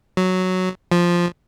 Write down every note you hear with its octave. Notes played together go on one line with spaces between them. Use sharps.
F#3
F3